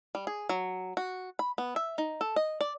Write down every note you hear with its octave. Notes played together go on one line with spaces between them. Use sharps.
G3
G#4
F#3
F#4
B5
B3
E5
D#4
A4
D#5
D5